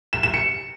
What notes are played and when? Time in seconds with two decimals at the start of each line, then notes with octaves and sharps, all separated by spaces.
0.13 E7
0.23 E7
0.34 C#7